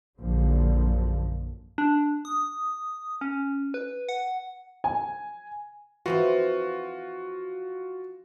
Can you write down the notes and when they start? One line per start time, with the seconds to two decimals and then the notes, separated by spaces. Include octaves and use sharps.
0.20 A#1 F#2 D3 F3
1.78 D4
2.25 D#6
3.21 C#4
3.74 B4
4.09 F#5
4.84 G#5
6.06 E3 F3 C4 F4 F#4